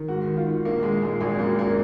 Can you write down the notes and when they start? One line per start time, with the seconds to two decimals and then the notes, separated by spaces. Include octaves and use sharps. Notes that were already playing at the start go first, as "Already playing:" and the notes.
Already playing: D#3
0.08 G#2 F#4
0.27 D#3
0.37 F4
0.46 D#3
0.65 A#1 A#3
0.83 A#1 G#3
1.02 A#2 G#3
1.21 G#1 G#3
1.39 F#2 A#3
1.59 A#3